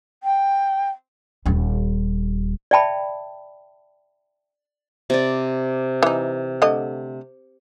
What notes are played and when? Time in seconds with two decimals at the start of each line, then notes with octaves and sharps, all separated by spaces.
0.23 G5
1.46 D#1 G3
2.71 D5 E5 G5 A5 B5
5.10 C3 D5
6.03 E3 D#4
6.62 D3 A3 D#5